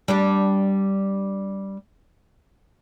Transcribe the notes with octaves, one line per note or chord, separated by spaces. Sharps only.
G3 D4 G4